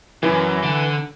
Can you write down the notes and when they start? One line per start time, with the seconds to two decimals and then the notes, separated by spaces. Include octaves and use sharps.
0.23 F#2 E3
0.63 D3